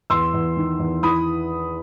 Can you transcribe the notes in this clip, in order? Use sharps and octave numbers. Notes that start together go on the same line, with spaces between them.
E2 C6 E6
E2
D#3
E2
E3 B5 D#6